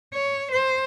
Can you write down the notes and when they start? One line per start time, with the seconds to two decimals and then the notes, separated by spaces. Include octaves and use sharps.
0.14 C#5
0.51 C5